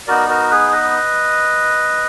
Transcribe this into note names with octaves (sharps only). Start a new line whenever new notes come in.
B3 D#4 F#4 A#4 D5
F#4 A#4
G#4 B4
B4 D#5